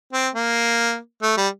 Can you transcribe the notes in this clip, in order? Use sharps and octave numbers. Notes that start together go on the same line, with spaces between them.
C4
A#3
A3
G3